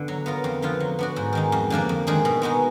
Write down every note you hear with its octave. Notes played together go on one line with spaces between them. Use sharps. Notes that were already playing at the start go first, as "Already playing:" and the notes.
Already playing: D3 B3
F#3
B3 F4 A#4
F2
D3 F3 B3 F4
F#3
B3 D4 F#4
G#2
D#3 G#3 D#4
F2
D3 F3 A#3 D4
F2
D#3 G#3 D4 G#4
B2
G#3 B3 D#4 F#4